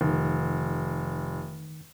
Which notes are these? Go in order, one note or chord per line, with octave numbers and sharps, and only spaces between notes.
F1 D#3